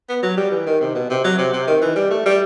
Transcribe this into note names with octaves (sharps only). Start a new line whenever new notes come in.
B3
F#3
G3
E3
D#3
C3
B2
C3
F#3
C3
C3
D#3
E3
G3
A3
G3